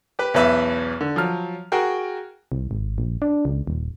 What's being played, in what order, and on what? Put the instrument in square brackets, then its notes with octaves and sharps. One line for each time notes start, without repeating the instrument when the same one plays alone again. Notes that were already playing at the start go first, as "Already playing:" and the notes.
[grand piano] G4 B4
B1 E2 B4 E5 B6
D3
F3 F#3 F6
F#4 G#4 A#4 G5
[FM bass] C2
G#1
A#1
D4
C#2
D#1